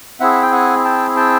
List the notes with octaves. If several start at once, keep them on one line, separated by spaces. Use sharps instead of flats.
C4 E4 G#4 E5 F#5
G5
F#5 G#5
G5 A5
G5 A5